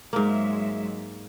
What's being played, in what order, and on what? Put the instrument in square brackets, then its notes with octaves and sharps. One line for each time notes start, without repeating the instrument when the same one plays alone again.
[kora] G#2 A#3 [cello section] F#3 G#3 E5